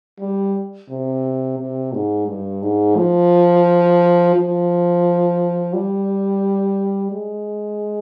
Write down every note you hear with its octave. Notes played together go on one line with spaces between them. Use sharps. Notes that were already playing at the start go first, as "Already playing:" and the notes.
G3
C3
C3
G#2
G2
G#2
F3
F3
G3
G#3